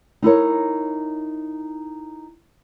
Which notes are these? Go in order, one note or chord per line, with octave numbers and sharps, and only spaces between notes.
D#4 E4 A#4 C#5